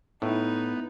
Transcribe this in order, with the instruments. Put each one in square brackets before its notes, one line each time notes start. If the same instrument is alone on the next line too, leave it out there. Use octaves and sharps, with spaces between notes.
[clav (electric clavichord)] A2 [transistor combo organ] B3 [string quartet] D#4 [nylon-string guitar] E4